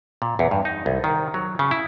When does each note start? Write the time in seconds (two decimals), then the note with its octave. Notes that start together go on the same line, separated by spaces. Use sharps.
0.22 A#2
0.39 E2
0.51 G2
0.65 D#4
0.86 C2
1.04 D#3
1.34 F#3
1.59 C#3
1.71 E4